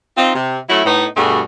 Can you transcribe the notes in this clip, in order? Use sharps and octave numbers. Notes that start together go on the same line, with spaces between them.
C4 D#4 F4
C3
F#3 A3 C#4 E4
A2 B3 D#4
G2 B2 G3 A3 F#4 G#4